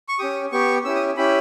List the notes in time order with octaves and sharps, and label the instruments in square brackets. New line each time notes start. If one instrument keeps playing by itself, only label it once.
[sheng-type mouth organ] C#6
C#4 G4 D#6
B3 G4 C#6
C#4 E4 G4 E6
D#6
C#4 E4 G4 B5